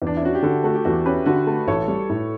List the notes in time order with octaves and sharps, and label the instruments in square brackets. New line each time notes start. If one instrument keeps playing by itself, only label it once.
[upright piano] E2
[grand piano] D4
E4
[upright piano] C#4 [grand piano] F#4
[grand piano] G4
[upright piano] D3 [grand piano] F#4 A4
[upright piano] A3 [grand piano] F#4
[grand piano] G4
[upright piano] E2 [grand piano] F#4 A4
[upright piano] C#4 [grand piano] G4 B4
[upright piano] D3 [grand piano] F#4 A4
[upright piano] A3
[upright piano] A1 [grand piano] A4 C#5
[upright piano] G3
A2